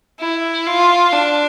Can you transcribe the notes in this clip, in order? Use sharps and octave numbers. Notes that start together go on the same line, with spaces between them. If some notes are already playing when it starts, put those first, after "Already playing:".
E4
F4
D4